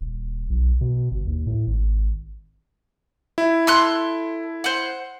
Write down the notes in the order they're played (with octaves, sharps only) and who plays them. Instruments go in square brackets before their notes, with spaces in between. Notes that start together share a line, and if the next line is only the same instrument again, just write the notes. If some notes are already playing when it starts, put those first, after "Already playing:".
[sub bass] D#1
B1
B2
G1
D#2
A2
G#1
[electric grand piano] E4
[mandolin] A4 C6 F#6
C5 F#5